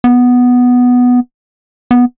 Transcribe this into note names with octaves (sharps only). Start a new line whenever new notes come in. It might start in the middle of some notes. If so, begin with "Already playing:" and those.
B3
B3